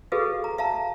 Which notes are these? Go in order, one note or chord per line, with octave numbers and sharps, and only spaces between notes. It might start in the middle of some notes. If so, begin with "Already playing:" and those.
F#4 G#4 A4 B4 D#5 F5
A#5
E5 F5 A5 A#5